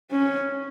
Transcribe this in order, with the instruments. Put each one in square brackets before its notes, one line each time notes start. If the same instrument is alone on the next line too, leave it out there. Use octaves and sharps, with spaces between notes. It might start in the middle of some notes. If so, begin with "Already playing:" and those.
[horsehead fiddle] C#4